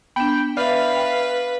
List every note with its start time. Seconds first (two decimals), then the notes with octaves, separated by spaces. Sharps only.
0.16 B3 D4 G5 B5
0.57 B4 D5 E5 F5
0.96 G5